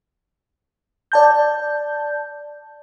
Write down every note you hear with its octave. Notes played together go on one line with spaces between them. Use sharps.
D5 A5 G6